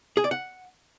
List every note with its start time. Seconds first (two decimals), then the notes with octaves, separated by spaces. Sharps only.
0.17 G#4
0.24 D5
0.31 F#5